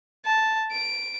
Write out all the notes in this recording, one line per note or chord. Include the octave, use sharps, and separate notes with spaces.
A5
D7